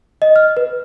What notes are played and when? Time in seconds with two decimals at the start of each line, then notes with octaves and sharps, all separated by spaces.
0.22 D#5
0.36 F6
0.57 B4